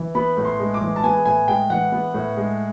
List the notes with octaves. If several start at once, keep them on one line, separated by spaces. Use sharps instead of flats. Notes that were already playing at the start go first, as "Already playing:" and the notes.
Already playing: E3
B3 B5
A2
C6
G#3
D6
E3
A5
B3 G#5
A2 G#5
G#3 G5
E3 F#5
B3
A2
G#3